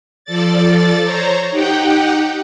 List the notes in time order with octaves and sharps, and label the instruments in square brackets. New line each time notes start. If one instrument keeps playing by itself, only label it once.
[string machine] F3 A4 D5 A6
C5 C#5 A#5
D#4 G4 F#5 G5